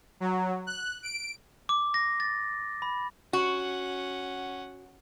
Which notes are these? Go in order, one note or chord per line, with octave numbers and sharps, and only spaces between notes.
F#3
F#6
D7
D6
A#6
A6
B5
C#4 F#4 F#5